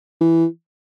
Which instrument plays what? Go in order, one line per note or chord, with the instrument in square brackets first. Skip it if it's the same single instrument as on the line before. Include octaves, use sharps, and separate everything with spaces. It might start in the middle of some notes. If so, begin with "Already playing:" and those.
[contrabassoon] E3